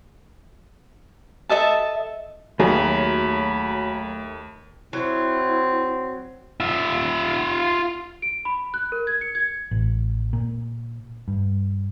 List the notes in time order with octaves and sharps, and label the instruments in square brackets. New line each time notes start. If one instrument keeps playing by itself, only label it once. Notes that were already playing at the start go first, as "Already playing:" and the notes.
[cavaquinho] A4 D#5 E5 A5
[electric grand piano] D#2 [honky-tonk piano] F#3 [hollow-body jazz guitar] A3 G#4 [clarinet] B5
[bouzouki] F#3 [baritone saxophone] C4 [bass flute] E4
[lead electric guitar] F4 E5
[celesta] D7
B5
F#6
A#4
G#6
C#7
G#6
[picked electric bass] A1
A#2
G2